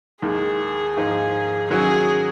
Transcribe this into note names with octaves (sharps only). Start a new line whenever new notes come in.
D#2 D#3 G#3 G#4
G#2 F3 A#3 D#4 G#4
D#3 F#3 C#4 F#4 G#4